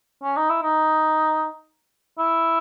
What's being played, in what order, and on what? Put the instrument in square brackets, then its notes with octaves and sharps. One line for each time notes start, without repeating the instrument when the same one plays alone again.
[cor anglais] C#4
D#4
E4
D#4
E4